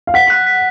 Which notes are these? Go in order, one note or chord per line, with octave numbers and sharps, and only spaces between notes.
F5
F#5 B6
F#6
B6